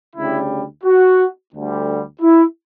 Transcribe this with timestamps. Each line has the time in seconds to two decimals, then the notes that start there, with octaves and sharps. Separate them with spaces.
0.15 D2 C#3 G3 E4
0.84 F#4
1.53 D2 D3 G3
2.22 E4